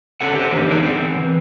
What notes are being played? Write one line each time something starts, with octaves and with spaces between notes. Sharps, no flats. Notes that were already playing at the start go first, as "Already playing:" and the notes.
D3 C#4 E4 A4 F#5
G4 C5
E3 F3 A#3 C#4 D4
D#4 G#4 D5
C4 F#5
E3